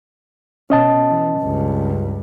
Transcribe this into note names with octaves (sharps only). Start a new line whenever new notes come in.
B2 C#4 D#5 A5
E3
C#2 G2